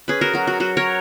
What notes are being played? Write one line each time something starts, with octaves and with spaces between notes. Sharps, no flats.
C#4 G#4 B4
F#4 A#4
F#3 F#4
F#4
F#3 F#4
A#4 C#5